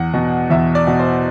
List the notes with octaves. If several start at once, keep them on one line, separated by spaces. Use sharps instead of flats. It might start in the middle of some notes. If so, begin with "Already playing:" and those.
Already playing: E2 F#5
B2
E2 E5
D5
B2
C5